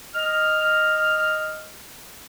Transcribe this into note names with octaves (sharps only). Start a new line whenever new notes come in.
D#5 F6